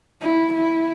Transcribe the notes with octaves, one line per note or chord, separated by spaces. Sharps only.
E4
E4